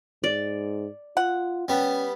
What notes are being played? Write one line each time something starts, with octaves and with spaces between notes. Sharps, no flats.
G#2 D5
F4 F#5
G3 B3 C#4